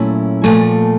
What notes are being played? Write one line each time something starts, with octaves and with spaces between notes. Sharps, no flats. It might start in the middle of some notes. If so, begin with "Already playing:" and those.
Already playing: A#2 F#3 A3 C#4 E4
A#2 F3 A3 G#5